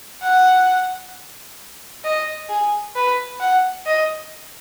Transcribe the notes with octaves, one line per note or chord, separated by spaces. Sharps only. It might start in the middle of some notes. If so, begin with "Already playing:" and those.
F#5
D#5
G#4
B4
F#5
D#5